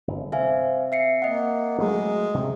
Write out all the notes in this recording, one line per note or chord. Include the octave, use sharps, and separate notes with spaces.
G1
C3 E5 F5 G#5
E5 C7 C#7
A#3 D#5 F#5
F#3 G#3 A3
C3